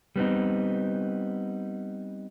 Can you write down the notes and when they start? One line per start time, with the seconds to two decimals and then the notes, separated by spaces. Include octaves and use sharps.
0.16 G3 B3 C4 D#4